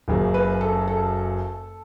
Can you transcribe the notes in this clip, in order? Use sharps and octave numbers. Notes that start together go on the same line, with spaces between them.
F#1 F#2 C#3
B4
A4
A4